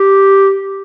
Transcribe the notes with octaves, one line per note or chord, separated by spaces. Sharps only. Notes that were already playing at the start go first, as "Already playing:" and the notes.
Already playing: G4